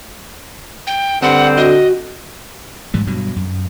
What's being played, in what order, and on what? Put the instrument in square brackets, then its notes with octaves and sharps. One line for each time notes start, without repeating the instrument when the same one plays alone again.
[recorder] G5
[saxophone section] G2 C4 [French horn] D3 [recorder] F#5
[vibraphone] F#4 [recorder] D#5
[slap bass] G#2 E3 G3
G2 B2 F#3
F#2